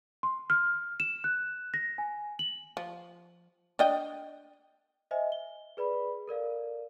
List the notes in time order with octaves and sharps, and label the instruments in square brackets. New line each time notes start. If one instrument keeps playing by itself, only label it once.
[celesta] C6
F6
E7
F#6
A#6
G#5
F#7
[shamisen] F3
D4 D#5 G5
[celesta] C5 D#5 E5 G#5
G7
G#4 B4 D5 B5
A4 A#4 D5 F5